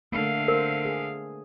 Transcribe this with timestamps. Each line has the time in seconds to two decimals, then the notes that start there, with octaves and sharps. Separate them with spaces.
0.12 D3 A3 A#3 F5
0.48 A#4 C5
0.85 G#4